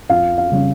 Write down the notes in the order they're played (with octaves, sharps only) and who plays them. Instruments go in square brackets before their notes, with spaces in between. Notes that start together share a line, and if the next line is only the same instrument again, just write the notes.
[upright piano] F2 F5
F5
C#3 G3 C#4